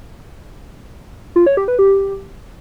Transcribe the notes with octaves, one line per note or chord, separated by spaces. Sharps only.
F4
C#5
G4
B4
G4